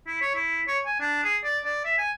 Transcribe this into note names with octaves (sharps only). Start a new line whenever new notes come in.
E4
C#5
E4
C#5
G#5
D4
G#4
D5
D5
E5
G#5